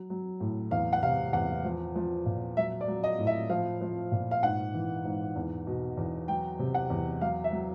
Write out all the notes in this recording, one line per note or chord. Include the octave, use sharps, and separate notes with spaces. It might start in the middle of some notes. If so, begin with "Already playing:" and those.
Already playing: F#3
F#3
A2
E2 F5
F#5
C3 F5
E2 F#5
F3
F3
A#2
F#3 E5
D5
F#3
D#5
A2
E5
F3 F5
F3
A#2
F5
G#2 F#5
E3
G#2
E2
B2
E2
F#3 G5
C3
F#5
E2
F#3 F5
E5
F#3